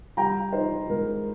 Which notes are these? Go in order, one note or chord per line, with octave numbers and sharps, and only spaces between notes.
G3 G5 A#5
D#4 C5
G#2 A#4